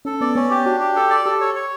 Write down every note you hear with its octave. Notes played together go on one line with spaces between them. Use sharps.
C#4 A4
B3 D5
B3 C#4
G4
D4 F#4
G4
A4
D5
G4 A4
C#5
C#5